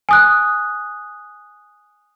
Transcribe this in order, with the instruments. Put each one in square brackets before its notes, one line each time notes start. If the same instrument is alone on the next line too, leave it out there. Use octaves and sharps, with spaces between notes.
[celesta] G#5 D#6 F#6